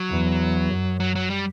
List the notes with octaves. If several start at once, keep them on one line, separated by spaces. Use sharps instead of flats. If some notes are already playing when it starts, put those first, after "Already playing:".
Already playing: F#3
E2
F#2
F#3
F#3
G3